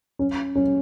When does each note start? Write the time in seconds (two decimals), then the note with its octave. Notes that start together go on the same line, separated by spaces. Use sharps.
0.19 C#4
0.55 C#4